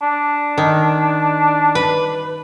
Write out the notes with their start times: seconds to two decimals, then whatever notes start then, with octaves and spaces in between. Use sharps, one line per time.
0.02 D4
0.58 D#3
1.75 B4